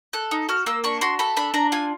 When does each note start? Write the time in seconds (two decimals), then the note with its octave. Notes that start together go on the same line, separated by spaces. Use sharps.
0.13 A4 F#6
0.31 D#4
0.49 F#4 F6
0.66 A#3 E6
0.84 D4 C#6
1.01 F#4 C6
1.19 A4 B5
1.37 D4 B5
1.54 D4 A#5
1.72 F4 G#5